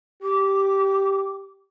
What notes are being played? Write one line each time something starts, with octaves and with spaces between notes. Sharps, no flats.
G4 D6